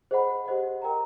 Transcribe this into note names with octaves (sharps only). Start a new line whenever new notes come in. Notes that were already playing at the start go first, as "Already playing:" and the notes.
G#4 C5 D#5 F#5 B5
G4 C5 D#5 F#5
A#4 D#5 G5 A#5